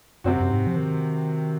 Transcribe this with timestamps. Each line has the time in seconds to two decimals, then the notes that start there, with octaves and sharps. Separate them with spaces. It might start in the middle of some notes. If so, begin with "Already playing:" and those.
0.24 F#2 C3 F#3 C4 F#4
0.40 F#2
0.51 G#2
0.67 F3
0.76 D#3